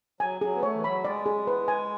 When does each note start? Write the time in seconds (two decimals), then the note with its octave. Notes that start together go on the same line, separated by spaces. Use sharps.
0.20 F#3 G#5
0.41 F#3 G#4
0.55 B3
0.62 A3 C#5
0.74 E3
0.84 F#3 B5
1.05 G#3 D5
1.26 G#4
1.47 B4
1.68 G#5